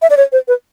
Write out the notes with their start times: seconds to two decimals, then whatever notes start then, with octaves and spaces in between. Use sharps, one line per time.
0.02 E5
0.10 D5
0.17 C#5
0.32 C5
0.48 B4